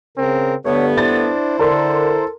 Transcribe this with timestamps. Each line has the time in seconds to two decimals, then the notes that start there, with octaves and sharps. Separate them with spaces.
0.18 C#3 C4 A#4
0.65 G2 D3 A3 B3 C#5
0.98 D4 E4 C5 A6
1.59 D3 A4 A#4 C6